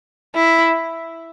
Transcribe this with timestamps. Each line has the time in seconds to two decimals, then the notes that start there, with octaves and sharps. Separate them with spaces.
0.35 E4